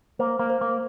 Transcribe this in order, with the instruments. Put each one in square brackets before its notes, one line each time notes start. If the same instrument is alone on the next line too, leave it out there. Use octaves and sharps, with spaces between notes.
[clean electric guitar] A#3 [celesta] C5
[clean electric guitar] A#3
[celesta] C5
[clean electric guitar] A#3